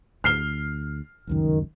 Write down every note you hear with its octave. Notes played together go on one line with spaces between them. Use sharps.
D2 F6 C7 G7
F1 C#2 F#2 D#3